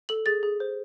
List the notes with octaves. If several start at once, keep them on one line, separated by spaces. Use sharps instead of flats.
A4 F#7
G#4 A6
G#4
C5